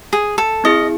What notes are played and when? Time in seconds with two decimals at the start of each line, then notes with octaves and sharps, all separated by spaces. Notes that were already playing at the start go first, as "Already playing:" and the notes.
0.13 G#4
0.38 A4
0.64 C4 E4 G#4 D#5